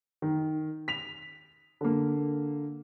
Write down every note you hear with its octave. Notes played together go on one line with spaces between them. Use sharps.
D#3
B6 F7
D3 A#3